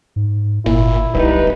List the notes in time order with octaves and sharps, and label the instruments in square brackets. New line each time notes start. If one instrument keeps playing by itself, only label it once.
[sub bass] G#2
[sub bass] G1 [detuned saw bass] A#2 [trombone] E4
[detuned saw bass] D1 [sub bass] B1 [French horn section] G3 D#4 B4